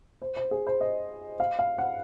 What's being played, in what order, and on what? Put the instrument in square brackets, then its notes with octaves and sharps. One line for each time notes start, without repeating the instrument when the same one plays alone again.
[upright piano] C5
C5
G#4
C5
D#5
F5
F5
F#5